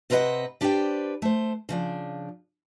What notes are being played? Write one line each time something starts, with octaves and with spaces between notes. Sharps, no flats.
C3 C4 A#4 B4 D#5 F#5
D4 G4 B4 C5 D5 G5
A3 C5
C#3 F3 D4